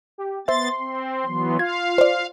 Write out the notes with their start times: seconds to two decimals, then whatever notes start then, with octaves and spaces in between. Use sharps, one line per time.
0.18 G4
0.48 B3 C5 E5 C6 A6
0.78 C4
1.25 E3 F#3 B3
1.59 F4 F5 G#6
1.98 C5 D5